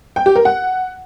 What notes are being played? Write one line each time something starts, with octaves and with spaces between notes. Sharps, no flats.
G5
G4
A#4
F#5